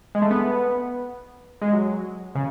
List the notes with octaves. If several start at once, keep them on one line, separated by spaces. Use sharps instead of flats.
G#3
A3
B3
G#3
F#3
C#3